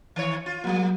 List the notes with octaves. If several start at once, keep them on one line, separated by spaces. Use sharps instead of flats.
D#3 C#5
F4
F#3 G3 A#3 F#4